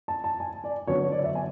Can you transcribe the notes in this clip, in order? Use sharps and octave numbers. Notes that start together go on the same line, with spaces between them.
A5
A5
G#5
D5
D3 F#3 B3 D4 C#5
C#5
D5
E5
G#5